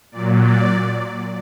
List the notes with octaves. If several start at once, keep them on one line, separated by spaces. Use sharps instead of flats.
A#2 F#3 D5
D5